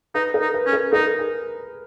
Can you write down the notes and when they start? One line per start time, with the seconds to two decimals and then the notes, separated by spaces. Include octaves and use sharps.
0.15 D#4 B4
0.34 A#4
0.41 D#4
0.54 B4
0.66 C#4
0.73 A#4
0.93 D#4 A#4
1.19 G#4